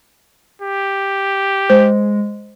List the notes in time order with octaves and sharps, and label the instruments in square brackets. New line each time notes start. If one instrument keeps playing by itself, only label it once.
[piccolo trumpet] G4
[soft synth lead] G#3 [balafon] C5